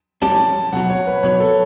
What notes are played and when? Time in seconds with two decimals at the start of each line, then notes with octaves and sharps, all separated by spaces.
0.22 B1 A2 G3 C#4 G4 A5
0.73 B1 B2 F#3 F#5
0.90 C#5
1.07 B4
1.23 B1 B2 F#3 C#5
1.40 A4